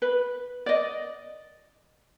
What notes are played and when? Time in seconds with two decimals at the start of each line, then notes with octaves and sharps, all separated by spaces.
0.02 B4
0.66 D5 D#5